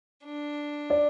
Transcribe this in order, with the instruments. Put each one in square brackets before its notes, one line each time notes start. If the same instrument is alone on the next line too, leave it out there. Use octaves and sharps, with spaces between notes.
[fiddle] D4
[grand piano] D5